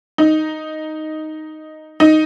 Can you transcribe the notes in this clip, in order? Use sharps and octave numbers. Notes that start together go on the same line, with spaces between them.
D#4
D#4